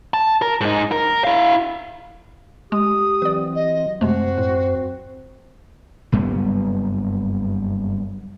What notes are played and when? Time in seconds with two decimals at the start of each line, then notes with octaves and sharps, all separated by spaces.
0.14 A5
0.42 A#4
0.61 G#2 D#4
0.92 A#4
1.24 E4 F5
2.72 G#3 G4 D#6
3.22 E3 F#3 C4 B4 D5
3.55 D#5
4.01 F#2 C3 G#3 A3 C4 F#4 C5
4.38 A2
6.12 F#1 G2 G3 B3